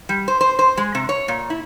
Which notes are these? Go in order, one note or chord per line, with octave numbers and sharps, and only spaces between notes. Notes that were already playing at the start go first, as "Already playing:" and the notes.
G3
C5
C5
C5
G#3
C3
C#5
A#2
E4